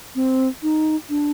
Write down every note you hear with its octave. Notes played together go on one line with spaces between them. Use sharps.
C4
D#4
D4